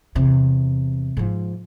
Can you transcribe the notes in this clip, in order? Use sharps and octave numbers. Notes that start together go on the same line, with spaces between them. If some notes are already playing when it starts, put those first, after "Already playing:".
E2 C3
G#2 F3